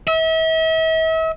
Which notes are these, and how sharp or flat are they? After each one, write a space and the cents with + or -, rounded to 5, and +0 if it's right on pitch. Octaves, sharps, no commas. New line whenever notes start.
E5 -40